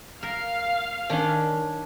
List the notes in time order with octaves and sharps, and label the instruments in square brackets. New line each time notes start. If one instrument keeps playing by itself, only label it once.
[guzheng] A#4 [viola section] F5
[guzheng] D#3 [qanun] C#4 D4